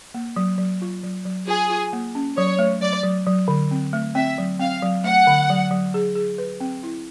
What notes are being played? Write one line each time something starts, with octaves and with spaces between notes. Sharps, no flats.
A#3
F#3
F#3
F4
F#3
F#3
F4 G#4
F4
A#3
C#4
F#3 C#5
A3
F#3 D5
F#3
F#3
D3
C4
A3
C4 E5
F#3
C4 F5
F#3
A3 F#5
D3
F#3
F#3
G#4
G#4
B4
C4
E4